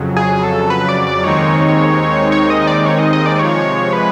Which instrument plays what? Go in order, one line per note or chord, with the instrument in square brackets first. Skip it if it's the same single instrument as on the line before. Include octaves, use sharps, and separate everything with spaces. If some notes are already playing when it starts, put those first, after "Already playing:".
Already playing: [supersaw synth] F2 C#3 F#3
[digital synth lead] G#4
A4
B4
D5
D5
[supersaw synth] D#2 D#3 G#3 C4 D#4 [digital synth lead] C#5
[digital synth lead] C#5
D#5
D5
C#5
D#5
D#5
D5
[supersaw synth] C3 F3 G#3 [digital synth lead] C#5
[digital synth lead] B4